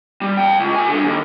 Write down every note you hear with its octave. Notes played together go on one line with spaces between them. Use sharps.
G3
F5 G5
C#2
F#4 G#5
G2 D3
D#2